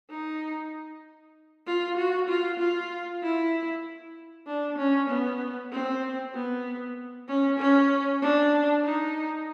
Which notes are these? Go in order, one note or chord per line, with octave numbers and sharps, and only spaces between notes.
D#4
F4
F#4
F4
F4
E4
D4
C#4
B3
C4
B3
C#4
C#4
D4
D#4